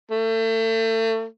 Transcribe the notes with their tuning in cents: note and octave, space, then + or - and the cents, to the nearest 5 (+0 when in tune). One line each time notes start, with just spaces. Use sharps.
A3 +35